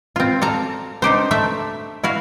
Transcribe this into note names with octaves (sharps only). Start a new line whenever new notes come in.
C4 F4
A4 F5 A#5
D4 D#4 G4 C5
A3 E5
E4 F#4 F5